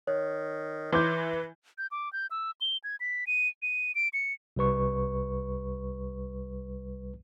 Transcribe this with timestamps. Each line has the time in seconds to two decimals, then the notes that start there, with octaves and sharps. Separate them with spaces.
0.07 D#3 C#5
0.92 E3 B4 C6 D6 G6
1.78 G6
1.92 D6
2.13 G6
2.31 E6
2.61 G7
2.84 G#6
3.00 B6
3.27 D#7
3.62 D#7
3.95 D7
4.13 C#7
4.56 C2 G3 B4 C#6